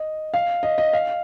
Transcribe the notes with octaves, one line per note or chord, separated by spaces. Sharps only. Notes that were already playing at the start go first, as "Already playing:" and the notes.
Already playing: D#5
F5
D#5
D#5
F5